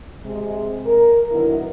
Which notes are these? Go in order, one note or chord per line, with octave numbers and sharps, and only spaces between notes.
C3 G#3
A#4
D3 D#3 F#3 B3 E4 A#4